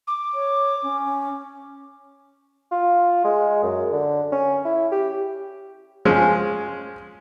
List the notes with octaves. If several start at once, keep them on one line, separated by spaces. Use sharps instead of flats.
D6
C#5
C#4
F4
G#3
F#2
D3
C#4
E4
G4
F3 G#3 C#4